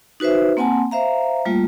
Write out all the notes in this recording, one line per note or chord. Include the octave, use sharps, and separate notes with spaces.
D#4 F#4 B4 C5 E5
A#3 C4 F#5 G#5 A5 C6
C5 E5 F5 A#5
G3 A3 A#3 F4